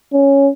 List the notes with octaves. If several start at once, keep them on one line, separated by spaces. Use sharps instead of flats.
C#4